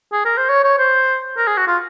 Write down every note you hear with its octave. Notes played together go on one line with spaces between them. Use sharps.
G#4
A#4
C5
C#5
C#5
C5
A#4
G#4
F#4
F4